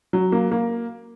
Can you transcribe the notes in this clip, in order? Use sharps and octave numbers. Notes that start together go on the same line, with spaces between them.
F#3
A#3
A#3